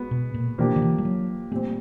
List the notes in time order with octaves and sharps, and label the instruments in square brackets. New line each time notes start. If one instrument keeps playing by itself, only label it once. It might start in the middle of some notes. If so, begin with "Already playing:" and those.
Already playing: [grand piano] G#3 B3 F#4
[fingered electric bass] B2
A#2
[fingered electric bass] B2 [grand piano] F3 A#3 D4 G4
[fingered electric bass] D#3
E3
G3
F#3
[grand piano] A#2 G3 C4 [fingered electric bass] A3